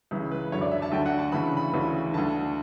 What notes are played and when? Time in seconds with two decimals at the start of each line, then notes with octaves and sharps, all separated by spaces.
0.11 C#2 C#3 E3
0.31 B4
0.52 F#2 D3 C#5
0.61 D5
0.71 E5
0.82 A5
0.92 D2 D3 G5
1.06 F#5
1.19 A5
1.32 D2 C#3 E3 B5
1.57 B5
1.73 D2 C#3 E3
2.13 D2 D3 A5